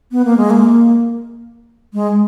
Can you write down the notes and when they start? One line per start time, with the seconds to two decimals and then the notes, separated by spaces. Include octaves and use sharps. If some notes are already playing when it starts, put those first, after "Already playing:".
0.12 B3
0.25 A#3
0.37 G#3
0.50 A#3
1.93 G#3